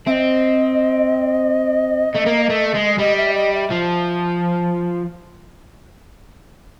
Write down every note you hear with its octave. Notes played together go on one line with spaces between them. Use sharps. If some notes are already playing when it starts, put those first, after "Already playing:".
C4 D#5 E5
A3
A#3
A3
G#3
G3 D#5
E5
D#5
E5
F3